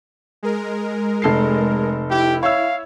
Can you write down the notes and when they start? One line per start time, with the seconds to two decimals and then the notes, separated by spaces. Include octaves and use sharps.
0.43 G#3 A#4
1.22 F1 A4 C7
2.10 E4 G4
2.43 C#5 E5 F5 E6